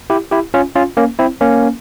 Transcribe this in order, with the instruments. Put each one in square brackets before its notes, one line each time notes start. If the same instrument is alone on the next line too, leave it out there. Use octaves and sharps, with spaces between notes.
[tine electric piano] E4 G4
E4 G4
C#4 F4
C#4 F4
A#3 C#4
C4 E4
A#3 C#4